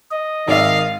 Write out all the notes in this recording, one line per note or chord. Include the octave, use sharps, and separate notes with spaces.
D#5
G#1 D#3 D5 E5 F5